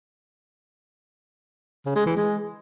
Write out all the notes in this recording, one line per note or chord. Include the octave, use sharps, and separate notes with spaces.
C#3
G#3
E3
G#3